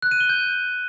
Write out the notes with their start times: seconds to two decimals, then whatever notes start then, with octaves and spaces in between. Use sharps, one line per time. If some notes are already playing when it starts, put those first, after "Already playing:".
0.02 F#6
0.11 D#7
0.20 G7
0.29 G6